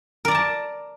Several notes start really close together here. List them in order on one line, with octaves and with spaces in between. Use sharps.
A#4 D5 A#5 A5